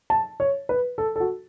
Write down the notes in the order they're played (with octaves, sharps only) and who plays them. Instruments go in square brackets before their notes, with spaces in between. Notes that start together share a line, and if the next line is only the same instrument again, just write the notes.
[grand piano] A5
C#5
B4
A4
A4
F#4